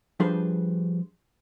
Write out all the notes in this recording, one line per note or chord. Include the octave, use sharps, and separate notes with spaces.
F3 G3 D4 G#4 B4 C5